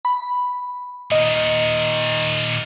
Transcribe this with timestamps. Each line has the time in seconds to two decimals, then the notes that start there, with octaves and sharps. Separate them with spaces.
0.05 B5
1.12 A#2 D#3 D#5